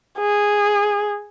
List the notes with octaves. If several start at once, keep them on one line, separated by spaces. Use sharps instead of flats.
G#4